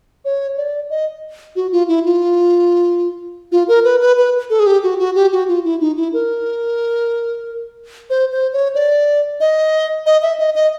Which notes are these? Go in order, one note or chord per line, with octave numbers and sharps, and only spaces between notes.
C#5
D5
D#5
F#4
F4
E4
F4
F4
A#4
B4
B4
B4
A4
G#4
G4
F#4
F#4
G4
F#4
F4
E4
D#4
E4
A#4
C5
C5
C#5
D5
D#5
D#5
E5
D#5
D#5